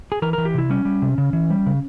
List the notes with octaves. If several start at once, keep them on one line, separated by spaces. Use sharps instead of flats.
G#4
E3 A#4
E3 A#4
G4
C3 E4
G3 C#4
G3
C3
C#3
E3
G3
C#3